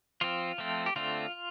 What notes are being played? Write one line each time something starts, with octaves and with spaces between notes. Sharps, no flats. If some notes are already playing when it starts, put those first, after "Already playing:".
F3 C4 F4
F3 A3 C4
G4
D3 A3 C4 F4